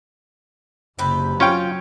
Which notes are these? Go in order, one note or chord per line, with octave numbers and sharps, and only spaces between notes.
F#1 C3 G4 B4
F#3 C#4 F4 G5